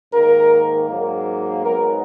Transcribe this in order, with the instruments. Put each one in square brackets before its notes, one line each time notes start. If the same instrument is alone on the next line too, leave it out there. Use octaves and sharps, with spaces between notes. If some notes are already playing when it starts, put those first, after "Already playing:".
[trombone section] G#2 D#3 A#3 A#4
G#2 F#3 A#3
G#2 F#3 B3 A#4